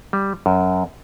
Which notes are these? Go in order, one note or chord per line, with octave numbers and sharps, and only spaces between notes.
G3
F#2